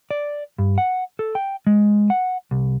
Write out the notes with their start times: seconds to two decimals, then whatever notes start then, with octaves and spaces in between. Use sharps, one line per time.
0.11 D5
0.59 G2
0.78 F#5
1.19 A4
1.35 G5
1.67 G#3
2.10 F#5
2.51 C2